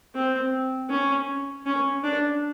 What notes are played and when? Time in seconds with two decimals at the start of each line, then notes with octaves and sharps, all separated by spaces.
0.15 C4
0.90 C#4
1.66 C#4
2.04 D4